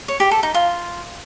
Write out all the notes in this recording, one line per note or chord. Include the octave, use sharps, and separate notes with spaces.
C#5
G4
A4
D#4
F4